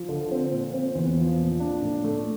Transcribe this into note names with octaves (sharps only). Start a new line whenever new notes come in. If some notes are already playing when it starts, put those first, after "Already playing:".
Already playing: F3
D3
C4
A#2
C4
E2
F3
A#2
D4
A2
A3